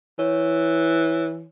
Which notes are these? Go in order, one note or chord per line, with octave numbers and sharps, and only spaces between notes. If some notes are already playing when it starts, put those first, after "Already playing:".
E3 C#5